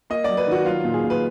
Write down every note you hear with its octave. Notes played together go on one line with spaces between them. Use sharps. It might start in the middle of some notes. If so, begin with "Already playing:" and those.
A#3 D#5
F#3 D5
B4
D#3 F#4
F#3 F4
A#2
G#4
A#2
B4